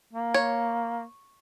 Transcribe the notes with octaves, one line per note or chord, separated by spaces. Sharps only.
A#3
C#5